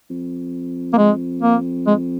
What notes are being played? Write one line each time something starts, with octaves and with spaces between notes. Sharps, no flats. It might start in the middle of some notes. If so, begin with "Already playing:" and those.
F2
A#3
G#3
A#3
G#3